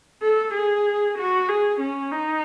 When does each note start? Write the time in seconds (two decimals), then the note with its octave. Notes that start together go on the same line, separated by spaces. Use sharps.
0.23 A4
0.54 G#4
1.18 F#4
1.49 G#4
1.80 C#4
2.12 D#4